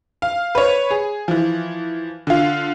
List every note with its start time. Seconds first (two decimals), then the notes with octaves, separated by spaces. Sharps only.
0.22 F5
0.55 B4 C#5
0.91 G#4
1.28 E3 F3
2.27 D3 F4